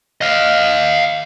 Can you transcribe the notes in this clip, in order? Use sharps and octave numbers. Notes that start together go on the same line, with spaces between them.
D#5 F5